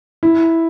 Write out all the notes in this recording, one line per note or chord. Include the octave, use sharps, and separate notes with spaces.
E4